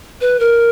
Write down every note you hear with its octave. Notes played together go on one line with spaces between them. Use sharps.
B4
A#4